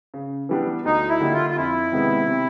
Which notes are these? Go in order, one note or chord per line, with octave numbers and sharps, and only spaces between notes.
C#3
E3 G3 B3 D4
D2 D#4
E4
D3 G3 A#3 D#4
F4
F4
F2 E4
C3 D#3 G#3 B3
C3